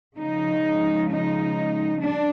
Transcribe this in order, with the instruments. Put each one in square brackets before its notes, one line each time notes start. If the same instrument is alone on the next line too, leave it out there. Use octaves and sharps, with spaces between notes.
[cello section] C#3 F3 G#3 D#4
D#4
G3 D4